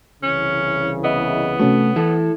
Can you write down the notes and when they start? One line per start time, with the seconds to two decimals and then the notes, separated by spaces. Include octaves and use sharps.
0.23 C2 C#3 E3 C#4
1.04 B3 G#4 D#5 E5
1.60 C3 A3 C#4 F#4
1.96 E3 E4 A4